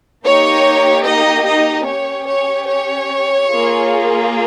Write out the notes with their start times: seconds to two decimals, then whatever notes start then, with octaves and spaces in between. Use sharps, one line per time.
0.24 A#3 D#4 G4 C#5
1.05 D#4 D#5
1.46 D#4 D#5
1.86 C#4 G4 C#5
2.28 C#5
2.68 C#5
3.51 A#3 F4 G#4